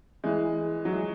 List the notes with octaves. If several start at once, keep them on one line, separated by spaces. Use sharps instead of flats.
E3 G#3
F#3
G#3